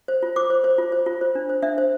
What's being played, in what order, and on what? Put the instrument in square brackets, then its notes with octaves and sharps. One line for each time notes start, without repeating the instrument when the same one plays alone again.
[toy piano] C5
F4
C5 D6
C5
C5
F4
C5
F4
C5
D4
C5
D4 E5
C5